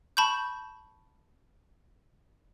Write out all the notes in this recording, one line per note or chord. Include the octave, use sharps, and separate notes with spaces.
A5 B5 C#6 G6